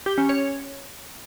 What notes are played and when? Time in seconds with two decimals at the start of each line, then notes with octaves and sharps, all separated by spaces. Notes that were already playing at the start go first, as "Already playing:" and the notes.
0.06 G4
0.18 C#4
0.29 C#5